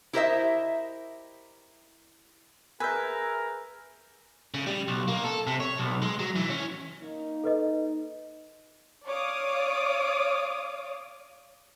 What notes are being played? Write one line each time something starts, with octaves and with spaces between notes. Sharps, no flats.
E4 G4 A#4 C5 D#5 E5
G#4 A#4 B4 E5 G#5 E6 G6
C#3
G3
B1
A#3
A4
C3
C#5
B1
G#3
F#3
E3
C#4
A#3 D#4
A4 B4 D#5
C#5 D5 F5 D6 D#6